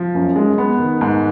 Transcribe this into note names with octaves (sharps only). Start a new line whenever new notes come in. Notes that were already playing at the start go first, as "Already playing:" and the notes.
Already playing: F3
F#2
G#3
B3
D#3
G#2